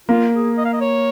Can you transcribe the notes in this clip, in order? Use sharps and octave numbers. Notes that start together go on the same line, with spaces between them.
A#3 F4
G#4
D#5
F5
D#5
C#5